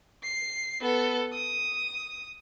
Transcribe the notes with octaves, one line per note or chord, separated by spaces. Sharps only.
C7
B3 A4
D#6